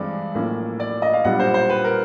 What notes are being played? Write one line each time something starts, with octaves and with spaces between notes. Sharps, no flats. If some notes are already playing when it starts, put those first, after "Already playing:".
Already playing: G2 E3 G#3 C4 D5
B1 A2 F3 A#3 C#4
D5
D#5
F5
B1 A#2 G3 B3 D4 F#5
C5
C5
B4
A#4